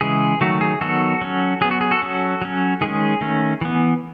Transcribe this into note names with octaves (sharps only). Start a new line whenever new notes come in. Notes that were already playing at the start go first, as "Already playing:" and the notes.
C#3 E3 G#3 G#4
D#3 F#3 A3 F#4
G#4
D#3 F#3 B3 F#4 A4
F#3 C#4
F#3 B3 G#4
F#4
G#4
F#4 A4
F#3 C#4
F#3 C#4
D#3 G#3 C#4 G#4
D#3 A3 C#4
E3 B3